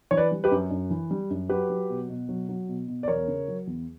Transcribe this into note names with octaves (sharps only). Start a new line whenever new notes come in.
E3 C#5
B4 D5
G3
G4 B4
F#2
F#2
E3
G3
F#2
F#3 G4 B4
F#3
B2
B2
F#3
F#3
B2
B2
D5
E2 A#4 C#5
C#3
F#3
E2